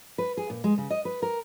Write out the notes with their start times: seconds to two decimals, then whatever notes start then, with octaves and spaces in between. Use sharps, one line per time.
0.18 B4
0.37 G#4
0.50 A#2
0.64 G#3
0.78 C#3
0.91 D#5
1.05 B4
1.22 A#4